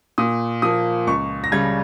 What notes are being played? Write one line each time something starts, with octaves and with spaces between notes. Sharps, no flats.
A#2 D#6
F3 A#3 D#6
C#2 C#6
A#6
C#3 G3 G#6